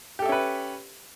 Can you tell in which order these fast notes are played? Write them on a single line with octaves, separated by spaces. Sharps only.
G4 A4 E5 C#4 B4